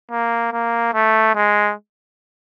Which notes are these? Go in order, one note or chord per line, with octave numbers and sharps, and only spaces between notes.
A#3
A#3
A3
G#3